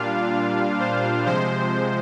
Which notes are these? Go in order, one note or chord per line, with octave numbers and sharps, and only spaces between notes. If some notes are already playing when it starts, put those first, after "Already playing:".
Already playing: A#2 G3 D4 F4 F5
C5
C3 F3 G#3 C5